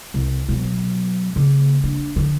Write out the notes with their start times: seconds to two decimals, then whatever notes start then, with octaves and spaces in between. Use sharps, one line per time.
0.14 C2
0.49 B2 F#3
1.36 C#3 A#3
1.84 D4
2.16 D3 F3